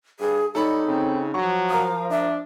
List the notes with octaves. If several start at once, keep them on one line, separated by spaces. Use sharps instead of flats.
G2 G#4
G3 D#4 A4 C#5 B5
C#3 C4
F3 F#3 C#6
A#4 F5 A#5 D#6
D4 E5